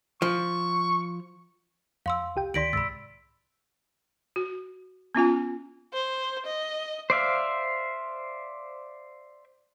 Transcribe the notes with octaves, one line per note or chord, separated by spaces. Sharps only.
F3 C#6
F2 F5 C6 E6
C2 G4 G5
D2 D#3 D5 C6 A#6 B6 D7 F#7
C2 G#2 B5 E6 A6
F#4
B3 C#4 F4 G#5
C5
D#5
C5 D5 E5 F5